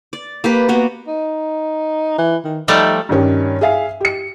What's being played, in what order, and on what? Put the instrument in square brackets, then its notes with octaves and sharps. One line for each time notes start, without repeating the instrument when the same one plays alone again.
[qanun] D5
A#3 G4 B4
A#3 B3 F#4
[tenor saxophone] D#4
E3
D#3
[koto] F3 G3 A3 [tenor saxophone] D#4
[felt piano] G2 D#3 C#4 G4
G#4 E5 F5 G#5
G4 C#7